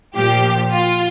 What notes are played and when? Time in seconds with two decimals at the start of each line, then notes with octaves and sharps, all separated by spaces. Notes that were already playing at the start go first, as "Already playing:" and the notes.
0.15 A#2 F3 G4
0.71 F4